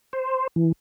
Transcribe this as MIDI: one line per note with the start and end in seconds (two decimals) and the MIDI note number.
0.13 0.47 72
0.56 0.72 52